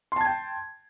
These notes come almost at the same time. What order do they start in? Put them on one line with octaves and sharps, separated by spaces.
C6 A5 G#6 G5